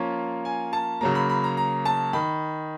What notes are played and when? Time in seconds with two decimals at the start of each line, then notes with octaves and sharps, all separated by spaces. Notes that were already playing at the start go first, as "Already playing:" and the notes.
Already playing: F3 A#3 C#4 F4
0.45 G#5
0.73 A5
1.01 C#3 F#3 A#3 A#5
1.15 B5
1.30 B5
1.44 A#5
1.57 A#5
1.85 A5
2.13 D#3 B5